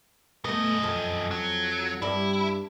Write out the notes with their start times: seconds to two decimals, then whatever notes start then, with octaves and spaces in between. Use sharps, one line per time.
0.45 F#2 A3 B3 D#5
0.83 F2
1.31 F#3
2.02 G2 E4 D5